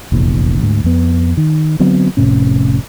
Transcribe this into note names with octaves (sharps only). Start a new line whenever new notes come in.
F1 A#1 E2
D2 G#2
F2 B3
D#3
D3 F#3 B3 C4
F1 A2 C3 C#4